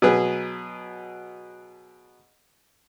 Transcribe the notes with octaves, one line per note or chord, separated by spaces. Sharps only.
B2 F#3 G#4 B4